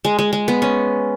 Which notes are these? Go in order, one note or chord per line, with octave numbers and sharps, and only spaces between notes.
G#3
G#3
G#3
B3
C#4